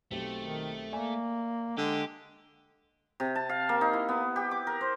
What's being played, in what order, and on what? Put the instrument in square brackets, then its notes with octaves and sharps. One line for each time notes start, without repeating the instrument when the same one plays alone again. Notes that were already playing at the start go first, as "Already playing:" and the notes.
[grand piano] B1 C4 G4 [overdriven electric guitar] A3
[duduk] D#3
[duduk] A#3 [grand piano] D5 E5 G#5
[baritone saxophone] D3 [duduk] G#3 [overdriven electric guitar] G4
[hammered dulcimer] C3
A5
F5
A#3
D#4
E4
B3
G4
D6
A#4
C5